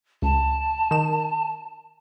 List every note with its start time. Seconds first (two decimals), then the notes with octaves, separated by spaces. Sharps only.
0.22 C#2 A5
0.91 D#3 E7